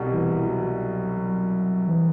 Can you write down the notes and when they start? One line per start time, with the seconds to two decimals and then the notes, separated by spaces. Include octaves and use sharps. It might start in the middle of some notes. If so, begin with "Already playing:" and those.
Already playing: C2 B2 G3
0.13 E3
0.47 F#3
1.17 F#3
1.87 E3